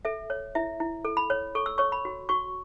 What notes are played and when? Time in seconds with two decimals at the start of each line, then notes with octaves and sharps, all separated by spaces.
0.05 A4 E5
0.30 C#5
0.55 E4 E5
0.80 E4
1.05 A4
1.17 B5
1.30 C#5
1.55 A4 C#6
1.66 E6
1.78 C#5 C#6
1.92 B5
2.05 F#4
2.29 F#4 C#6